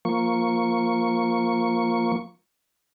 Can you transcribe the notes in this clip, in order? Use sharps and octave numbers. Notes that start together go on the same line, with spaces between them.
F3 A#3 C#6